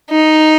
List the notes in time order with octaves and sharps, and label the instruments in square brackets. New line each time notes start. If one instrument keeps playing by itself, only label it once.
[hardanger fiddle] D#4